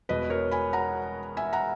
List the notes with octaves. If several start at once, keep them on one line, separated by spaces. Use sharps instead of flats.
E1 E2 B2 B4 D#5
A#4 C#5
G#5 B5
F#5 A#5
E5 G#5
F#5 A#5